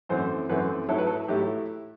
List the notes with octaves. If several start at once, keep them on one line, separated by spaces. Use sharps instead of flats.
F#2 E3 A3 C4 C5
F#2 E3 A3 C4 B4
A2 F#3 A3 E4 A4
B4
A4
A2 F#3 A3 E4 G4